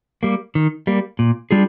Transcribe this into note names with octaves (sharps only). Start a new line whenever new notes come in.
G3 A#3
D#3
G3 A#3
A#2
G3 D4 F4 G#4